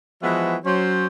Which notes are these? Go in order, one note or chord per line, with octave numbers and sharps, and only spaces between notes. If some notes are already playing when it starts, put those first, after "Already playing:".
E3 F3 G#3 B3 F#4 E5
F#3 C#4 C5